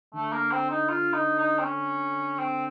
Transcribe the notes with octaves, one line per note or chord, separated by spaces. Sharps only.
D3 A3
A#3
C4
D#4
F4
D#4
D#4
C4
C#4
C4